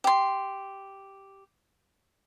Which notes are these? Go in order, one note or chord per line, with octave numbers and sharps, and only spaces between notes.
G4 C6